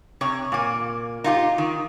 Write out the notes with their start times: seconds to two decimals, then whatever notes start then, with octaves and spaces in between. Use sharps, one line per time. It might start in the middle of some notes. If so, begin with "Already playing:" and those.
0.21 C3 C#5
0.52 A#2 A#3
1.24 D#4 F4 G4
1.58 D#3